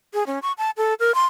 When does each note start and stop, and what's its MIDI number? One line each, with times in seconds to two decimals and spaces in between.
0.14 0.23 68
0.27 0.39 61
0.42 0.52 85
0.58 0.70 81
0.77 0.94 69
1.00 1.14 70
1.15 1.24 84